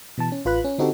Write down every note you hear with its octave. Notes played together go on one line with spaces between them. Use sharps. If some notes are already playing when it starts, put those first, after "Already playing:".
B2 E3 A5
C#4
A1 F4 B4 B5 F#6
C#4
D3 C4 D#4 F#4 G4 A4